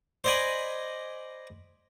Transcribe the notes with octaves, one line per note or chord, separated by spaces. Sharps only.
C5 D5 D#5 G#5 B5